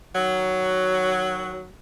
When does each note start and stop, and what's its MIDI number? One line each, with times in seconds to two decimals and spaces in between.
0.15 1.67 51
0.15 1.67 54